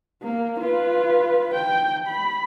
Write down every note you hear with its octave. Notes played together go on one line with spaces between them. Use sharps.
A#3
F4 B4
G5
B5